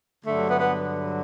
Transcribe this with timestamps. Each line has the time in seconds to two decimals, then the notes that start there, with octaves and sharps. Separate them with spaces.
0.25 G2 D3 F#3 A3
0.48 B3
0.59 B3